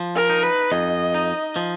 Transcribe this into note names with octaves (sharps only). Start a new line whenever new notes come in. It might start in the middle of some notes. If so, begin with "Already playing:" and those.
Already playing: F3
A#4
D#4
B4
F2 D#5
D#4
F3